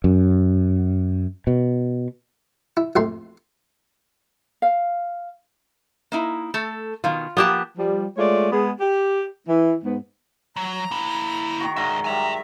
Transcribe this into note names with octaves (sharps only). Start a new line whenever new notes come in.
F#2
B2
E4
A#1 F2 A3 C6
F5
A#3 D#4 E4
A3 A4
B2 D#3 F4
F3 A#3 B3 G4 A5
F3 G3
G#3 A3 F4 C#5 D5
G#3 B3 G#4
G4
E3
G#2 B3
F#3 A#5
A#3 E4
D#3 F#4
G#2 D5 E5 A#5
F#3 G3 E5 G#5 A#5